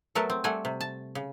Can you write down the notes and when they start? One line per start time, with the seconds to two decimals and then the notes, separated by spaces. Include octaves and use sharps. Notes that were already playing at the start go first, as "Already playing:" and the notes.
0.15 F#3 A3 B3 A#4 B4 A5
0.30 C4
0.44 G3 A3 F#5 G#5
0.65 C3
0.81 A5
1.15 C#3